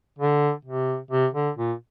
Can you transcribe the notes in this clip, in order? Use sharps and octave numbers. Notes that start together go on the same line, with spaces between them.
D3
C3
C3
D3
A#2